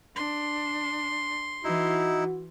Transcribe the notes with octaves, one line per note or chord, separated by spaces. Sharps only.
D4 C6
E3 D#4 E4 F#4